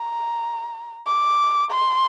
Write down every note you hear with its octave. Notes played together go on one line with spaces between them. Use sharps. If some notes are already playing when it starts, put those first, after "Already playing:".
Already playing: A#5
D6
C6